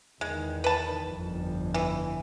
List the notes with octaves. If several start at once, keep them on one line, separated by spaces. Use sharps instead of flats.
E2 D#3 G#3
B4 A5
G1 F2
E3